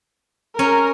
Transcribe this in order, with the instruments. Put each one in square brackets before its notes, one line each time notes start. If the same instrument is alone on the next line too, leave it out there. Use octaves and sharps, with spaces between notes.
[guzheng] C#4 [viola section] A#4